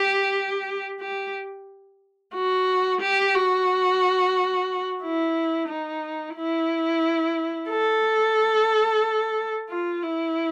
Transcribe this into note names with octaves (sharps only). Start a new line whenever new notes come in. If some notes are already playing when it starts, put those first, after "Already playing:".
Already playing: G4
G4
F#4
G4
F#4
E4
D#4
E4
A4
F4
E4